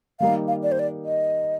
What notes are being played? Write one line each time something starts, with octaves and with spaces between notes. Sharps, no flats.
D#3 G3 A#3 D#4 F5
F5
D5
C5
D5
D#5